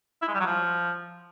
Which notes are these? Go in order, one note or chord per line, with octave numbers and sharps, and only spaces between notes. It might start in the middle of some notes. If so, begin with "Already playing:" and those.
E4
G#3
G3
F#3
F3